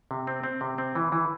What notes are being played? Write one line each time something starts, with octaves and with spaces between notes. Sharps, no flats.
C3
C4
C4
C3
C4
E3
E3